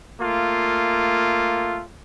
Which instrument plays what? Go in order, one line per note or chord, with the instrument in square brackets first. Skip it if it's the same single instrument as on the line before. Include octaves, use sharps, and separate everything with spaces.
[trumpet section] A3 A#3 F4